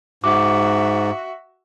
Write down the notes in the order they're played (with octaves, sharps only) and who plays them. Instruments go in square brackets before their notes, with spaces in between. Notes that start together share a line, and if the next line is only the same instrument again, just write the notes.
[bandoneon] G#2 [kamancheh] F#4 E5 [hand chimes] D6